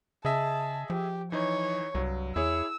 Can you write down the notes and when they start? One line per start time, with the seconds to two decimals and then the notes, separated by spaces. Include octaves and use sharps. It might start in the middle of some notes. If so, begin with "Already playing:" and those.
0.25 C#3 G#4 D#5 E5 A5
0.90 F3 G4
1.32 E3 D#4 C#5
1.95 C2 G2 F#3
2.36 E2 E4 G#4 C#5 E6